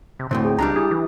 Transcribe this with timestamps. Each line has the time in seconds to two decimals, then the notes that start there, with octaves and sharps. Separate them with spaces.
0.19 C3
0.31 D2 A2 C3 C4
0.44 G#4 G5
0.59 C#2 G3 D4 A#5
0.76 E4 G4 G#4 D#6
0.91 E3